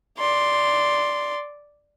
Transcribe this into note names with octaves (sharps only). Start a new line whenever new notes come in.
D5 C6